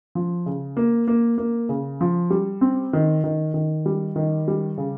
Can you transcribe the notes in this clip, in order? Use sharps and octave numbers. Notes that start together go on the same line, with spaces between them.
F3
C#3
A#3
A#3
A#3
C#3
F3
G3
C4
D#3
D#3
D#3
G3
D#3
G3
C#3